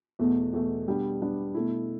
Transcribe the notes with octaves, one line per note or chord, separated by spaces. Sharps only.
E2 B2 A3
E2 B2 A3
B2 G3 B3 D4
B2 G3 B3 D4
B2 A3 E4